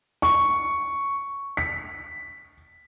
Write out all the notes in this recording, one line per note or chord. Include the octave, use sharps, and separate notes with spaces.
C#6
B6